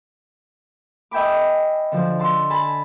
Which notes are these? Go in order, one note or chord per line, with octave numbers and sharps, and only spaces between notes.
D#5 E5 G5 G#5 B5 D6
D3 F3
A5 C6 E6
G#5 A5 B5